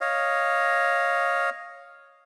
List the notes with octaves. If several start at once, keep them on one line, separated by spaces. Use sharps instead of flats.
C#5 D#5 F5